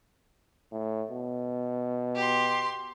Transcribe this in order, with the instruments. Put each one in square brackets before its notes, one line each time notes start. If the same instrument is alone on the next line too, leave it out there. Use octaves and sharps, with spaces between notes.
[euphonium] A2
B2
[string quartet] G4 C6